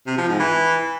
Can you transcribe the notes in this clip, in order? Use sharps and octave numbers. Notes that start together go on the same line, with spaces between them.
C3
F3
G#2
E3